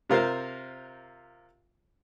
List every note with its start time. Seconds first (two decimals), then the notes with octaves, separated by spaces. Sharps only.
0.10 C3 F4 A#4 C5 F5